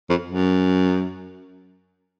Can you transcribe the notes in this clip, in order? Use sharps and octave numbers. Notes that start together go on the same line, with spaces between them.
F2
F#2